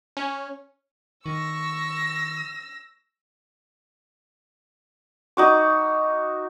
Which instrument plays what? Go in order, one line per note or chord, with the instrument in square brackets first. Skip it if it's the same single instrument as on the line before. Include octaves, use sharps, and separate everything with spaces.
[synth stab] C#4
[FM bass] D#3 [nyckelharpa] C#6 [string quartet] E6 A#6
[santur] D#4 F#4 D6